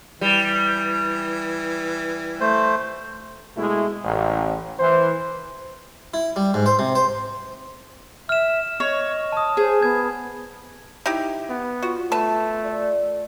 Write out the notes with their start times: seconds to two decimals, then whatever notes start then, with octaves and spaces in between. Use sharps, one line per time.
0.21 E3 G3
2.40 A3 C5
3.56 B2 G#3 A3 E4
4.04 A1
4.79 E3 C5
6.14 E4
6.36 G3
6.54 G#2
6.66 C5
6.79 C3
6.95 C5
8.29 E5 F6 E7
8.80 C#5 D#5
9.32 A5 D#6
9.57 G#4 C5
9.83 B3 G#6
11.06 D#4 E4 G4
11.49 B3
11.83 F4 F#4
12.12 A3 B4 A5
12.63 D5